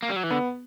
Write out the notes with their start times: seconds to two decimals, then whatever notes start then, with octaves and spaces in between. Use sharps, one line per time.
0.03 A#3
0.10 G3
0.16 F#3
0.23 E3
0.31 D3 B3